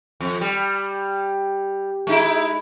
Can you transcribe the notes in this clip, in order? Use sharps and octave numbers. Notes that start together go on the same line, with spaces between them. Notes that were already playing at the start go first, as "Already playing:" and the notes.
F2
G3
G#3 D#4 E4